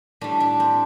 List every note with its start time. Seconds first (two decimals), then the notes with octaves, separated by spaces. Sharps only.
0.21 A2 G3 D4
0.40 D4
0.60 C4